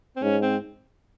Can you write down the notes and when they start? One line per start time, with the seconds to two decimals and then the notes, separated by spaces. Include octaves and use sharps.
0.16 C4
0.22 G#2 C#4
0.43 C4